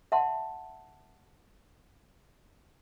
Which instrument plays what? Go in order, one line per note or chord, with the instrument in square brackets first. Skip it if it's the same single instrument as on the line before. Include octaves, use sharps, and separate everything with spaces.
[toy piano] E5 F#5 A5 C6